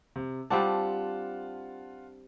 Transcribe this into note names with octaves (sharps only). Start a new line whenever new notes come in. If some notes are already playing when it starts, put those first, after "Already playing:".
C3
G3 C4 D4 F4 F#5 A5